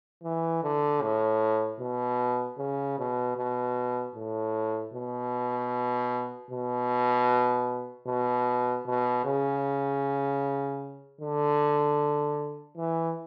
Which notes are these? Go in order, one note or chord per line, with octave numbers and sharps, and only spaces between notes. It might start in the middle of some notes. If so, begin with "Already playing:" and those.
E3
D3
A2
B2
C#3
B2
B2
A2
B2
B2
B2
B2
C#3
D3
E3